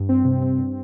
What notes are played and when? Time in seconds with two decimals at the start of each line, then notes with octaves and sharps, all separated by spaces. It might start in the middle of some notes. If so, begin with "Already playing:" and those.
Already playing: G2
0.09 C4
0.25 C3
0.42 C4
0.58 G2